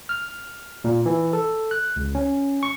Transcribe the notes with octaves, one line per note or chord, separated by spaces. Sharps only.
F6
A#2
E3
A4
F#6
C#2
C#4
C#6